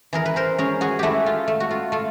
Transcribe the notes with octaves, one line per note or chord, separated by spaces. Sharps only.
E3 G#4 A#4
B4
A#4 C5
C#4 G#4 A#4
F#4 G#4
A3 E4 F#4 G4
F4
A3
F#4
F4
A3 F4